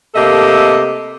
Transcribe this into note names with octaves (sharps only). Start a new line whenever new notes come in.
C3 A3 A#3 G4 A4 D#5